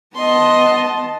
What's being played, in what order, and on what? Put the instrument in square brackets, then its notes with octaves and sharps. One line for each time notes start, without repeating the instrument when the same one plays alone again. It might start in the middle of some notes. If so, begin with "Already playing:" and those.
[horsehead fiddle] B3 A5 [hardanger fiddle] D#5 C6